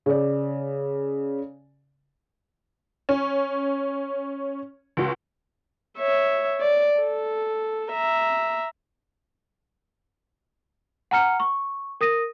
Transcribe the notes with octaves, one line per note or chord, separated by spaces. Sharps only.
C#3 D5
C#4
C#2 F#4
C#5 E5
D5
A4
E5 A#5
F#5 G#5 A#5 F6 C#7
C#6
A#4 D#6 A#6 D#7